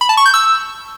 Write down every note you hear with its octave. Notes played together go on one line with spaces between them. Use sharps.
B5
A5
C#6
G6
E6